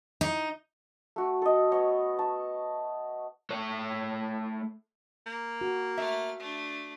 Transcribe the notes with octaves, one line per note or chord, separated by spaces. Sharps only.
D#4
A3 F#4
A4 D#5
B3 C#5 D#5
A5
A3 C#5
A#3
F#4
A3 E5 F6
A3 D4